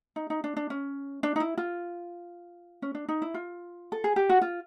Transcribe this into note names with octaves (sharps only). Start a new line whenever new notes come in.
D#4
D#4
D4
D4
C#4
D4
D#4
E4
F4
C#4
D4
D#4
E4
F4
A4
G#4
G4
F#4
F4